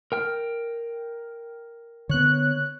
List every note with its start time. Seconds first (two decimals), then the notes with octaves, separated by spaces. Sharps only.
0.12 A#4 G5 F6
2.09 D3 B3 C#5 F#6